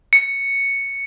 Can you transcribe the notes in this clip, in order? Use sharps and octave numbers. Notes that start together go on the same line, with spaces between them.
C#7